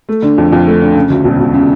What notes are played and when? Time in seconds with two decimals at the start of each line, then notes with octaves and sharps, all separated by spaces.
0.09 A3
0.23 D3
0.38 F2
0.52 F2
0.67 A3
0.81 D3
0.96 C#3
1.10 D2
1.24 E1
1.39 E1
1.54 C#3